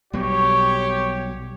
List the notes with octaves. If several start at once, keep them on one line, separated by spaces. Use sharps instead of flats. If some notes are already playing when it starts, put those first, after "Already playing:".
B1 B2 G3 G4 C#5